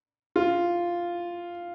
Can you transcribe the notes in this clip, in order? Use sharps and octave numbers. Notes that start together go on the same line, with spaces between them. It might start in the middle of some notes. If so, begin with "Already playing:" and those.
F4